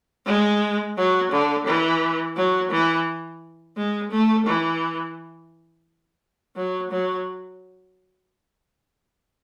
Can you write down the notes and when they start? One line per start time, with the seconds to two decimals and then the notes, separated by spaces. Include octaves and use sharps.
0.26 G#3
0.97 F#3
1.32 D3
1.66 E3
2.36 F#3
2.71 E3
3.77 G#3
4.11 A3
4.46 E3
6.56 F#3
6.91 F#3